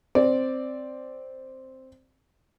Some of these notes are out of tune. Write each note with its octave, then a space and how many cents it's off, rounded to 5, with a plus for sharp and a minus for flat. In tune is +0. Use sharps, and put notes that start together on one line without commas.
C4 +0 D5 +0